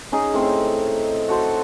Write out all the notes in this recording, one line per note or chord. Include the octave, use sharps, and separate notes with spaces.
C#4 D#4 G#4
A2 C4
F#4 A4 C5